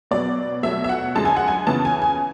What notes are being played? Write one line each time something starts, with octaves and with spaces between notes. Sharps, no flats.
B2 F#3 B3 D5
B2 F#3 A3 E5
E5
F#5
F#2 D3 G#3 A5
G#5
F#5
G#5
C#3 E3 B3 A5
G#5
G#5